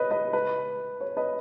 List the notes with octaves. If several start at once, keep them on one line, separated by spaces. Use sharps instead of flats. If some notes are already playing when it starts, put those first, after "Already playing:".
Already playing: B4 C#5 D#5
B4 D#5
B4
C#5
B4 D#5